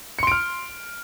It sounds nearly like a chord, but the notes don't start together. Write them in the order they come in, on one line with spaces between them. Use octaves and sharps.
C#7 C6 D7 F6